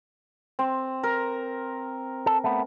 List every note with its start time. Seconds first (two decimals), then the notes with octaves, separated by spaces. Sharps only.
0.59 C4
1.03 A#4
2.26 A4
2.44 A3 B3